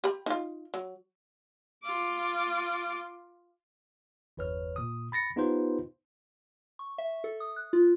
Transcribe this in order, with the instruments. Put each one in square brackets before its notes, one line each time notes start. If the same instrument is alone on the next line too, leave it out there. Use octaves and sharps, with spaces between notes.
[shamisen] G4 B5
D#4 F4
F#3
[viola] F4 D6
[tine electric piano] G1 E2 B4 C#5 F6
A#2 D#6
B5 A6 A#6 C#7
B3 D#4 F4 G4 B4 C5
[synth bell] C#6
E5
A4
D#6
F#6
F4